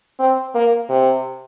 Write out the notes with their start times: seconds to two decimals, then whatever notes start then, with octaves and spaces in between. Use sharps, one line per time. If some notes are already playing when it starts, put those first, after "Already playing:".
0.19 C4
0.55 A#3
0.89 C3